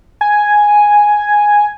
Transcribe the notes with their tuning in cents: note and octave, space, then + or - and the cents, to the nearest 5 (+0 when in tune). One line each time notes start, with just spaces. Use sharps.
G#5 +0